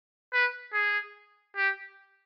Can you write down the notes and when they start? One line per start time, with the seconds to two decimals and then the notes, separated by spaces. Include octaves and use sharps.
0.33 B4
0.73 G#4
1.56 G4